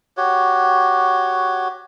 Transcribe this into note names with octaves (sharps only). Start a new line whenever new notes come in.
F#4 G4 C#5